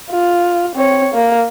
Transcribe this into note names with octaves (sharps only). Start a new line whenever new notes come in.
F4
C4 C#5
A#3